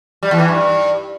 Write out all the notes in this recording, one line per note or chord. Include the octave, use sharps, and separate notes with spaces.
G3
E2
E3
G2